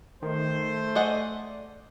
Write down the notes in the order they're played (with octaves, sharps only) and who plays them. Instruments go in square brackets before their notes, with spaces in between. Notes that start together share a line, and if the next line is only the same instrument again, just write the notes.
[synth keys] D#3 [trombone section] A3 [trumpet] C5
[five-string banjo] G#4 D#5 F#5 [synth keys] D5